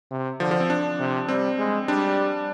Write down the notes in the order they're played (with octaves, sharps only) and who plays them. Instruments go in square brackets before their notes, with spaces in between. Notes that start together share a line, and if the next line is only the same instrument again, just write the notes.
[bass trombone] C3
[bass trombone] D3 [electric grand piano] F3
[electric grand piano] F3
C4
D4
[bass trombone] C3
[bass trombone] G3 [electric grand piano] C4
[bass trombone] G#3
[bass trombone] G3 [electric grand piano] D4